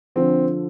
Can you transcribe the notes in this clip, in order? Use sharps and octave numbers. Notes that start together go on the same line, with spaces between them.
D3 F3 C4